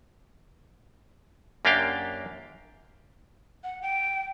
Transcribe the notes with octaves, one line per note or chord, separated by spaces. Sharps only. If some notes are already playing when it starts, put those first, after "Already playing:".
F#2 A#3 D4 G4 F5 G5
F#5
G5